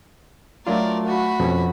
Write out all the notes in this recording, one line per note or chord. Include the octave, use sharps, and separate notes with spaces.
F#3 A3 D4 F4 A#4 D5
F#4 B5
F2 B2 C#4